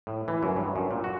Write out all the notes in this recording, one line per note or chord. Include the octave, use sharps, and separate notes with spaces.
A2
E3
F#2
G2
F#2
A#2
F#4